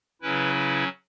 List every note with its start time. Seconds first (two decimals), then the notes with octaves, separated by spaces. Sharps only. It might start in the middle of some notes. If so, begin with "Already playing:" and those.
0.22 C#3 F#3 C#4 E4 B4
0.55 B4